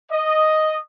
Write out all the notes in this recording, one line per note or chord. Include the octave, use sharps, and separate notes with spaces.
D#5